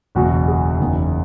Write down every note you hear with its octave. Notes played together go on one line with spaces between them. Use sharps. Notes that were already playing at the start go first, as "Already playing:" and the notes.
F#1 E2 B2 F#4
G#4
F#1 E2 D#3